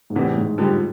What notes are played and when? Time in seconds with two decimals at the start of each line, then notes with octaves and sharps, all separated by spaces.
0.10 G#2
0.15 E2 A2 C3 E3
0.37 G#2
0.58 F2 D3 G3